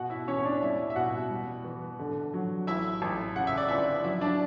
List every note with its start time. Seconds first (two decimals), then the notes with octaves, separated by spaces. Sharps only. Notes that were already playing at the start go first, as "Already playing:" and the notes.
Already playing: B2 F#4 F#5
0.10 E4 E5
0.27 E2 C#4 C#5
0.44 D4 D5
0.62 G3 E4 E5
0.90 E5
0.95 B2 F#4 F#5
1.30 G3
1.64 E3
1.99 D3
2.34 F#3
2.67 A1 E4 E5
3.02 A1
3.35 C#3 F#5
3.47 E5
3.57 D5
3.68 G1 E4 E5
4.04 F#3 E4 E5
4.21 D4 D5